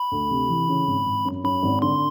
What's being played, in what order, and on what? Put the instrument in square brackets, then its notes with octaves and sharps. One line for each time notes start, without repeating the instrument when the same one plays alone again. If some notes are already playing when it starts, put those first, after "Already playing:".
Already playing: [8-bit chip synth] B5
[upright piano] D2
C3
E3
C#3
G#1
G#1
F#2
[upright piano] F#2 [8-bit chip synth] B5
[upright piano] G#1
[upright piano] D3 [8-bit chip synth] C6